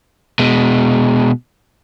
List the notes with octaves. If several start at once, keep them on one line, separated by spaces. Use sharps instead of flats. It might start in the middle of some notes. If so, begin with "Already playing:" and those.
B2 G#3